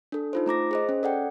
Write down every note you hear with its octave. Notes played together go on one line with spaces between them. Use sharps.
D4 A4
D#4 F4 C5
A3 A#5 D6 A#6
G#4 C5 D#5
C#4
A4 D5 F#5 G5